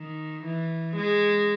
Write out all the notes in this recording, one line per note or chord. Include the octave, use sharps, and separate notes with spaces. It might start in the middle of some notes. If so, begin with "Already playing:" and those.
Already playing: D#3
E3
G#3